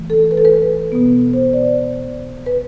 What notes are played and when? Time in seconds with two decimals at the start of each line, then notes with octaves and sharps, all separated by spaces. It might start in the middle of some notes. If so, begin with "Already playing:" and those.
Already playing: E3 A3
0.10 A4
0.31 B4
0.38 A4
0.45 B4
0.92 B2 B3
1.33 C5
1.53 D5
2.46 B4